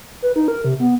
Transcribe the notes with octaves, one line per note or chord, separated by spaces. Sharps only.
B4
D#4
A#4
C3
B3